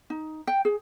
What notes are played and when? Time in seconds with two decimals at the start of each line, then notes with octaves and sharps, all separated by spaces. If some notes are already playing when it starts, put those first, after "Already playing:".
0.10 D#4
0.47 G5
0.65 G#4